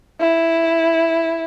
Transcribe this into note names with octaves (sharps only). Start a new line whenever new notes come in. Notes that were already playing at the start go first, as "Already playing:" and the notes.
E4